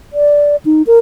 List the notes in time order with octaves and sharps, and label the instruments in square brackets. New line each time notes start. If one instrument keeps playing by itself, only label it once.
[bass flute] D5
D#4
A#4